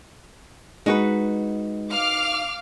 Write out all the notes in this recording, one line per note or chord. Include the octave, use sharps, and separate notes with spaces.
G#3 D#4 F#4 B4
F5 D6 F6